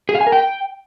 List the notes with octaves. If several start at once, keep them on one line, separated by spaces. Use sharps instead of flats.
G#4
F5
G#5
A#4
G5